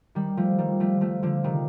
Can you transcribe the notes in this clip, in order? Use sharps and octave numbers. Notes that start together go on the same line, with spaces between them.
D#3 G3
F3 A3
D#3 G3
F3 A3
F3 A3
D3 F3
C3 D#3